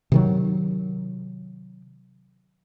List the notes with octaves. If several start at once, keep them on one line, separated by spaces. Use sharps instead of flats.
C3 D#3 F#3